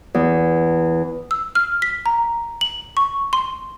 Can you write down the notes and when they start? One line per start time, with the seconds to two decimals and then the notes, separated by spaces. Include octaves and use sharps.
0.15 E2
1.31 E6
1.55 F6
1.82 B6
2.06 A#5
2.61 F#7
2.97 C#6
3.33 C6